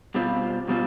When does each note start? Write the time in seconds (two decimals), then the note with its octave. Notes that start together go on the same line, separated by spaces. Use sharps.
0.14 B2 G3 C4 F4
0.68 B2 G3 C4 F4